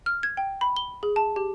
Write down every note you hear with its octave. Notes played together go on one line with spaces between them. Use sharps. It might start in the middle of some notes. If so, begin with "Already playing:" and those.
F6
G#6
G5
B5
G7
G#4
A5
G4